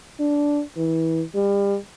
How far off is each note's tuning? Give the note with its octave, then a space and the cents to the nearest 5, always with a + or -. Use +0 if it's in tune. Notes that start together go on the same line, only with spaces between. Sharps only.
D4 -10
E3 -25
G3 +30